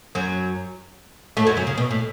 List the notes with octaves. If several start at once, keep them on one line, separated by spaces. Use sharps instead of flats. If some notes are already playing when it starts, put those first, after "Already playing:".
F#2 F#3
A2 A3
F#2 F#3
F#2 F#3
C#3
B2
A2